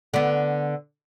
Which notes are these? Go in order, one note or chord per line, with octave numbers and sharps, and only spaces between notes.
D3 B3